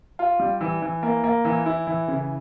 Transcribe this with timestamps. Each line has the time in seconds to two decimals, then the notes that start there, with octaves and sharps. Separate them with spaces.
0.19 F4
0.39 G3
0.61 E3
0.82 E3
1.03 A#3
1.24 A#3
1.45 E3
1.66 E4
1.87 E3
2.08 C#3